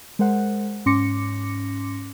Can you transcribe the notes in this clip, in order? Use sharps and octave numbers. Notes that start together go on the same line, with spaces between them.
G#3 A#4 C5 F#5
G#2 C#4 C6 D6 A#6 C#7